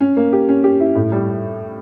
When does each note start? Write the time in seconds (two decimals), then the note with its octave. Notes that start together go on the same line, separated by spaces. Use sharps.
0.01 C#4
0.17 A#3
0.33 G4
0.49 C#4
0.64 G4
0.80 E4
0.95 A2
1.12 G3